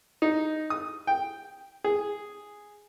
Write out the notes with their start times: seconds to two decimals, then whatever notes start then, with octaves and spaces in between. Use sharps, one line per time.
0.22 D#4
0.70 D#6
1.07 G5
1.84 G#4